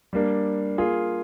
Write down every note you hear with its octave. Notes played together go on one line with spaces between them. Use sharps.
G3 A#3 D4
A#3 F4 G#4